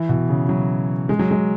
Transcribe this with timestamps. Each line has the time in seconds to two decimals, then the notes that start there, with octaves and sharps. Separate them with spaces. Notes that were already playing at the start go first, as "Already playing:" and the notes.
Already playing: E3
0.09 B2
0.29 C#3
0.49 F#3
1.09 G#3
1.19 F#3
1.31 G#3